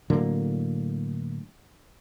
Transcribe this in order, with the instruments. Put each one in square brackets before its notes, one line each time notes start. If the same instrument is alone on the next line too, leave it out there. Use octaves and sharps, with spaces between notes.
[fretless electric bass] A2 D3 F#3 A#3